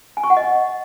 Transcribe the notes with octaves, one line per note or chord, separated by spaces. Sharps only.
G#5
C#6
F#5
D#5